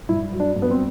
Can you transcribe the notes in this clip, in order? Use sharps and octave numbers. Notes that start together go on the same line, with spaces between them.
G2 E4
F#3
D4
G2
B3
C4